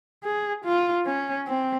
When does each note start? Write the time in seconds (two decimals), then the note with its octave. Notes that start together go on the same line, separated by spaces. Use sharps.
0.24 G#4
0.65 F4
1.06 C#4
1.47 C4